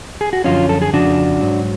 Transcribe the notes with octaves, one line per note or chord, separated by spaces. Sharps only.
G#4
F#4
F#2 D3 F3 C#4 F4
A4
G#4
F2 C#3 F3 D4 F#4
G#2 F#3